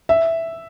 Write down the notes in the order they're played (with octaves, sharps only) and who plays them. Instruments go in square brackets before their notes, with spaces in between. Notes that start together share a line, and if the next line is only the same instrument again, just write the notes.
[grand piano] E5